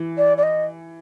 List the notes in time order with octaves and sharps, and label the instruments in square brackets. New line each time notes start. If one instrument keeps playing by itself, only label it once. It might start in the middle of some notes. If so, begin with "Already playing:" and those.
Already playing: [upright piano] E3
[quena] D5
D5
D#5